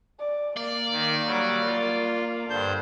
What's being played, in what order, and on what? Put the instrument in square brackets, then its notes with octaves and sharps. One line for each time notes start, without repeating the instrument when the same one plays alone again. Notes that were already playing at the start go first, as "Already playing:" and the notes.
[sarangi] D5
[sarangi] A#3 [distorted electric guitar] D5
[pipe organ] D#3
F#3 G3
F4
[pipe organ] G2 C5 G6 [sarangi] D3